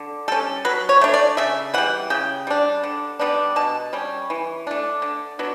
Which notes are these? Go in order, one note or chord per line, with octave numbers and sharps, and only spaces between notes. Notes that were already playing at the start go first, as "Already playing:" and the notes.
Already playing: D3
G3 C#4 A4
F#3 B4
C#5
A3 D4
D5
C#3 E5
E3 G3 F#5
C#3 G5
G3 D4
D3
G3 B3 D4
B2 A5
G3 C#4
E3
A3 D4
D3
F#3 B3 D4